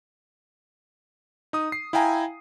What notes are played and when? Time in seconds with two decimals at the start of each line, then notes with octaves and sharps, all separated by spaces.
1.53 D#4 D#6
1.72 C7
1.93 E4 F5 G5 G#5 A#5